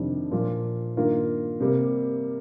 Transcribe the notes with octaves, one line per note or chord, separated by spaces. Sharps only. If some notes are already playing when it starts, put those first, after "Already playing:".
Already playing: F2 C3 D#3 G3 D4
A#2 F3 A#3 F4 A#4
G2 D#3 A#3 F4 A#4
C3 G3 A#3